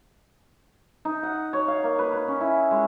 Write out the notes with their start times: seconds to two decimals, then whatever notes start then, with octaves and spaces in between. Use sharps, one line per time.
1.05 D#4
1.23 F#5
1.53 C#5
1.68 F5
1.83 A#3
1.99 B4
2.13 B4
2.28 C#4
2.41 E4
2.71 G#3